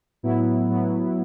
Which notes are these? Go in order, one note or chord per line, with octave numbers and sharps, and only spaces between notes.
A2 F#3 B3 E4
A2 F#3 B3